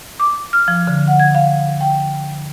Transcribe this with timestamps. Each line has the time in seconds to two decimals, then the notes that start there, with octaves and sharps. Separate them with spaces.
0.20 D6
0.53 F6
0.68 F3
0.87 D3
1.08 F#5
1.20 G#6
1.35 F5
1.81 G5